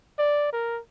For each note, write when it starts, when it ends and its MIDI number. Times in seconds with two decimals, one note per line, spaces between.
0.19 0.52 74
0.52 0.80 70